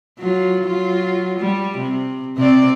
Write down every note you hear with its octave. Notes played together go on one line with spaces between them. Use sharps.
F#3 F4
F#3 F4
G3
C3
C3 C4 D5